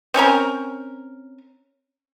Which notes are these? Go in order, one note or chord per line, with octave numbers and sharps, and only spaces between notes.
C4 C#4 A#4 A#5